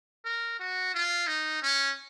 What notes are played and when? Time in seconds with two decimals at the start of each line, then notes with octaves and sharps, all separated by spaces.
0.25 A#4
0.59 F#4
0.94 F4
1.27 D#4
1.62 C#4